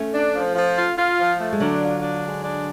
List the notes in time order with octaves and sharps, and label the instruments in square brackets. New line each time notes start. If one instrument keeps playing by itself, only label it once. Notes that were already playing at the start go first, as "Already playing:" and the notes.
Already playing: [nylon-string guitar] A3 C#4
[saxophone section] D4
F3
F3
F4
F4
F3
A3
[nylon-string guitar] G#3
[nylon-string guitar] D3 F#3 [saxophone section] D4
[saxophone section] F4
D4
G#3
D4